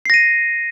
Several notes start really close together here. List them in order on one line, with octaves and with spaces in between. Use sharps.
C7 A#6 D#7